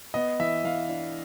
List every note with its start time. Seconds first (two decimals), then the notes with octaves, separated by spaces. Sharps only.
0.14 B3 D#5
0.40 E3 E5
0.64 E3 F5
0.89 D4